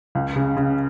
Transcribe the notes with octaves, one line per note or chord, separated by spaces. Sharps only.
C#2
C#3
C#3